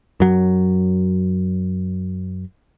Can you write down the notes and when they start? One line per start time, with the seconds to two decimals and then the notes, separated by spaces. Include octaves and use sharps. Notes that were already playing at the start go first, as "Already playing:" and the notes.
0.20 F#2 F#3